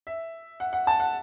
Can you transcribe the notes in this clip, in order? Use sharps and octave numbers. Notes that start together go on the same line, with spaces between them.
E5
F#5
F#5
A5
F#5